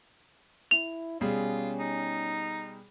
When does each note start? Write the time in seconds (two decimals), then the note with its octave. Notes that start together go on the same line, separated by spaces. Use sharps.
0.71 E4 F7
1.21 B2 G3 C#4 F4 G#4
1.79 D#4